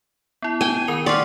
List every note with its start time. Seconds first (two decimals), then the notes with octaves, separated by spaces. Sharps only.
0.42 B3 E4
0.61 G5 G#5
0.88 D#3 A#4 F7
1.06 D5 F5 F#5 C6 C#6